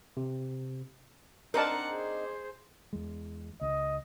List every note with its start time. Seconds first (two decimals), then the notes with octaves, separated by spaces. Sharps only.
0.17 C3
1.54 C4 D4 D#4 A#4 D5 F#5 A5
1.89 G#4 C5
2.93 E2 G#3
3.61 C#2 D#5